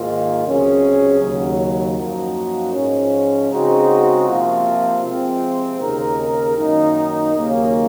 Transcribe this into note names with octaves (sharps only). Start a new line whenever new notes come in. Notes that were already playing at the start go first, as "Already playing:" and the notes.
Already playing: G#2 D#3 A#3 F4
C#2 C3 F#3 C#4 G#4
D#2 C#3 F#3
F#2 F3 A#3 D#4 F#4
G#2 F3 G#3 C#4
C#3 G#3 C4 D#4 F#4
C3 F3 A#3 F4
C3 F3 G#3 C4
D#2 C#3 G#3 D#4 A#4
F#2 D#3 A#3 D#4
D#2 C#3 F#3 A#3 C#4